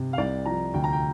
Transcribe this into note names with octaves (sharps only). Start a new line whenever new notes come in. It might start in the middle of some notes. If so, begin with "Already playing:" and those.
Already playing: C3
F5
C2 D5
F3 A#5
D2 G5
A#5
G5